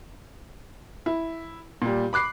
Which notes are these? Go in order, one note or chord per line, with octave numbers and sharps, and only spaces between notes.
E4
A#2 G3
B5 D6 F#6 C7